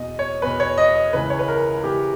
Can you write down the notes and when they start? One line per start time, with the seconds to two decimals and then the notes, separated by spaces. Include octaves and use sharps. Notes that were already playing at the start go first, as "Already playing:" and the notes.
Already playing: E2 B2 D#5
0.19 C#5
0.42 E2 B2 B4
0.60 C#5
0.78 D#5
0.96 D#5
1.13 C#2 C#3 E3 B4
1.30 C#5
1.39 B4
1.48 A#4
1.83 C#2 C#3 E3 G4